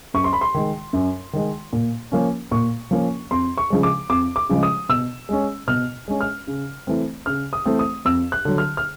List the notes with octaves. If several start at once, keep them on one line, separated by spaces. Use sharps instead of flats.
F#2 C#6
C6
B5
C6
D#3 G#3
F#2
D#3 G#3
A#2
F3 A#3 C#4
A#2 C#6
F3 A#3 C#4
F2 C6
C#6
C#3 F3 G#3
D6
F2 D6
D6
C#3 F3 G#3
D#6
B2 E6
G#3 C#4
B2 F6
G#3 C#4
F6
C#3
E3 A3 C4
C#3 F6
D#6
E3 A3 C4
D#6
F2 E6
F#6
D3 F#3
F6
F6